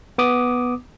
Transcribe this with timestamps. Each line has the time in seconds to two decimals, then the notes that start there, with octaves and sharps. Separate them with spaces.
0.18 B3 D6 D#6